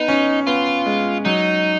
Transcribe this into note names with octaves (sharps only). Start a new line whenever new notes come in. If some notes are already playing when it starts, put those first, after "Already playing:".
Already playing: B3 D#4
C#4
B3 F4
G#3
F#3 D#4